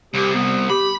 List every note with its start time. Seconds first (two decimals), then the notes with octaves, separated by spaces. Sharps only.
0.14 C2 G4
0.35 B3
0.70 G4 B5